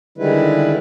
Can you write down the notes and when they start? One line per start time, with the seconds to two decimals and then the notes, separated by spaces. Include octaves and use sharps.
0.18 D3 D#3 G3 G#3 E4 B4